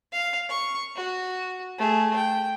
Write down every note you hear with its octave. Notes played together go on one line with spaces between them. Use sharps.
F5
C#6
F#4
A3 G#4
G5